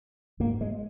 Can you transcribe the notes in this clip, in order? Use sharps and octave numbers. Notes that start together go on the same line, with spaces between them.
G#2 A#3
G#3